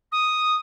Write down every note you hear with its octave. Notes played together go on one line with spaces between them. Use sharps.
D#6